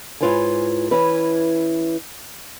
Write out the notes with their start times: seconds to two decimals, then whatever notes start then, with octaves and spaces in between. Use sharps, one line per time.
0.21 G#2 E4 F4 B4 C#5 G#5
0.91 E3 C#4 E4 B4